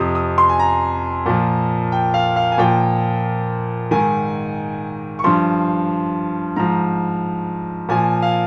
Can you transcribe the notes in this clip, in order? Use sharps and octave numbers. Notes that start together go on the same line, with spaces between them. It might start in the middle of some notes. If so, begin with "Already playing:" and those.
Already playing: F2 C3 F3 D#6
D#6
C6
G#5
A#5
A#2 F3
G5
F5
F5
G#5
A#2 F3 G5
G#2 D#3 G#5
C#6
G2 F3 C6
G#2 F3 A#5
A#2 F3 G#5
F5